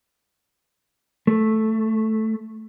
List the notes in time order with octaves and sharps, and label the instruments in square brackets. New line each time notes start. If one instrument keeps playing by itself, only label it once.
[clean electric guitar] A3